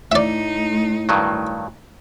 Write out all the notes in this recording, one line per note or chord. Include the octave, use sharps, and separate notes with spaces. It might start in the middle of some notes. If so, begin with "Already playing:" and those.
A2 A3 D#4 D5 E5
G2 D#3 F#3